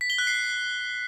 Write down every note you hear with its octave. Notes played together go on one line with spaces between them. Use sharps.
B6
G7
F#6
C7